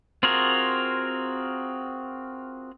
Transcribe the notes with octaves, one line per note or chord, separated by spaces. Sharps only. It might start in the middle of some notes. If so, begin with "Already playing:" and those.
C4 F4 F#4 G#4 A#4